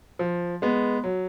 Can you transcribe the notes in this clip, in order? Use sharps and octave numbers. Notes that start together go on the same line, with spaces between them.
F3
G#3 B3
F#3